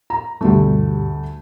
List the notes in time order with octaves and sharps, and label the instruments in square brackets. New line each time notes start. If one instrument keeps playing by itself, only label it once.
[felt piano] A#5
[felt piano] D2 A3 [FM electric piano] G2 B2 G3